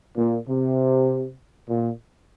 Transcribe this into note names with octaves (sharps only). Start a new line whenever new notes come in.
A#2
C3
A#2